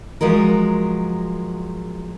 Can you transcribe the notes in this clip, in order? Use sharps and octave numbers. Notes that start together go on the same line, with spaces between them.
F3 F#3 G#3 A#4